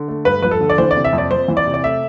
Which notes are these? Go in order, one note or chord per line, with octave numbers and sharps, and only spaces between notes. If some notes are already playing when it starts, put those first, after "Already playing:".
Already playing: D3
A3
G2 B4
F3 B4
A4
D3
D5
E3 C5
D5
C3
E5
F2
D5
F2 C5
E3
D5
C3
D5
A3 E5